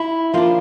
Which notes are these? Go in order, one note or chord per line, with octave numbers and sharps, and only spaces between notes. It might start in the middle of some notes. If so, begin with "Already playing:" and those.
Already playing: E4
F3 A#3 D4 F4